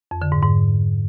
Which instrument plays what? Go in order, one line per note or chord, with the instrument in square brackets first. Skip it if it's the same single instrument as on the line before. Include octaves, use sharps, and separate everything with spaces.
[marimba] F2
D3
G#2
G#2